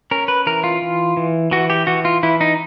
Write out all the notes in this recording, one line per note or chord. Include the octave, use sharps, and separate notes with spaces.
C#4 A#4
B4
E3 A#4
F4
E3
E3
E3 F#4
G4
E3 F#4
F4
E3 E4
D#4